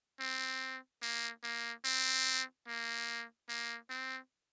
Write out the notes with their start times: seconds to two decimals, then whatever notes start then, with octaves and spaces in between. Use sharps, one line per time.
0.20 C4
1.02 A#3
1.44 A#3
1.85 C4
2.68 A#3
3.49 A#3
3.90 C4